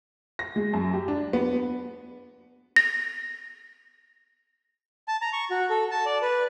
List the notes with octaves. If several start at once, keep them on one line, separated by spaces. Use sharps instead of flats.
A#6
G#3
F#2
G4
D4
B3
A#6
A5
A#5
C#6
F#4
A4
A5
D5
B4